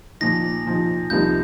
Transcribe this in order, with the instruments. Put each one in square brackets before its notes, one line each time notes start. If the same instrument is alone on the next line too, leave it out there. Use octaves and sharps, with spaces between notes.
[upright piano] A#2 F3 D#4 [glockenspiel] A#6
[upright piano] A#2 F3 D#4
[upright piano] C2 C3 F3 A#3 D#4 [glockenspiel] G6